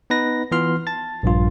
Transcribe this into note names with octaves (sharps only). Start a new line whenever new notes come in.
B3 D#4 B4 A#6
E3 B3 F4 C6 F6
A5 A6
A#1 G2 F4